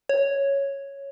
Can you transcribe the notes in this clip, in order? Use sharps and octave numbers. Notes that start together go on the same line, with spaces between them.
C#5